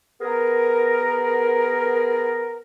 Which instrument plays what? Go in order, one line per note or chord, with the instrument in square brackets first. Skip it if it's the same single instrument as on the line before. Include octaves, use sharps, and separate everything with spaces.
[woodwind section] B3 G#4 A#4